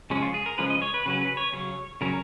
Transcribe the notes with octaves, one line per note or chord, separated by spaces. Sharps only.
C#3 F3 G#3 C#4
F4
G#4
A#4
C#3 F3 G#3 C#4 B4
D#5
C#5
B4
C#3 F#3 C#4 B4
B4
C#5
C#3 F#3 C#4 C#5
C#3 F#3 C#4 A#4